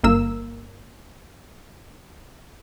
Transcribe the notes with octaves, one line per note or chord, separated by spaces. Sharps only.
G1 A#3 E6